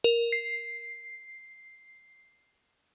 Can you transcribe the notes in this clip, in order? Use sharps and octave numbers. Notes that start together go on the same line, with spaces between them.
A#4
C7